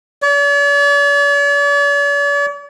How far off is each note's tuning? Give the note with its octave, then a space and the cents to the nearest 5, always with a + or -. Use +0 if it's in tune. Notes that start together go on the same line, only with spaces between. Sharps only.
D5 -45